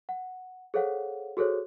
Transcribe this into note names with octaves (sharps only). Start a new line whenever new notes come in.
F#5
G#4 A4 C5 C#5 F5 F#5
F#4 G#4 A4 C5 C#5